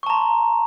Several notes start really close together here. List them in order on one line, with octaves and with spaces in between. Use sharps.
C#6 A5 A#5 C6